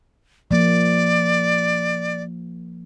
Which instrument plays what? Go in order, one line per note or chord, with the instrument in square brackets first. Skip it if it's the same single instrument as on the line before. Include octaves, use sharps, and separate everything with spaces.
[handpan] F3 A#3 [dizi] D5